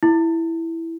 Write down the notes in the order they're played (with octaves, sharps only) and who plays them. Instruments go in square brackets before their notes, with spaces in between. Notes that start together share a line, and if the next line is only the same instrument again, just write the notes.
[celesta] E4